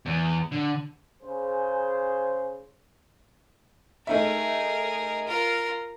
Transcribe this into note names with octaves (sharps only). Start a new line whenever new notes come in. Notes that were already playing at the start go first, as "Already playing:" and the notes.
E2
D3
C#3 G#4 C5
A3 D#4 G#4 A#4 E5
F4 A#4